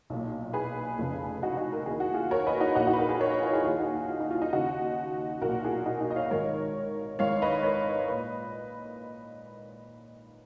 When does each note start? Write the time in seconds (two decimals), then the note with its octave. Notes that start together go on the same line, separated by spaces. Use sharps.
0.10 B1 A#2
0.53 G#4 B4
0.99 F1 F2 C#3
1.43 D#4 F#4
1.57 D#4 F#4
1.72 A#4
1.86 D#2 D#3 G#4
2.00 F#4
2.14 F4 G#4
2.31 A#4 C#5
2.47 B4 D#5
2.60 D#4 F#4
2.75 A#1 A#2 D#4 F#4
2.87 D#4 F#4
2.93 B4
2.98 F#4 A#4
3.09 G#4 B4
3.20 A#4 C#5
3.31 B4 D#5
3.42 F4
3.53 F4 G#4
3.64 D#2 D#3 F4 G#4
3.79 D#4 F#4
3.95 F4
4.08 F4
4.20 D#4
4.31 F4
4.42 D#4
4.53 D#2 C#3 D#4 F#4
5.41 B1 A#2 F#4 A#4
5.64 F4 G#4
5.86 D#4 F#4
6.01 D#4 F#4
6.11 D#5
6.16 C#5 F5
6.26 D#5
6.31 G#1 G#2 D#3 A#4 C#5
7.19 G#1 G#2 D#3 C#5 F5
7.42 B4 D#5
7.63 A#4 C#5
8.08 A#2 B4 D#5